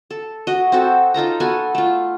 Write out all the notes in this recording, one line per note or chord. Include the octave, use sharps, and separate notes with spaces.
A4
F#4 D#5
C4 F#4 A4
D#4 F4 A4 A#5
B3 F#4 A4 G#5
A3 F4